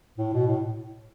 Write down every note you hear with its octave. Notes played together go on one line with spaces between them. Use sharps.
A2
B2
A2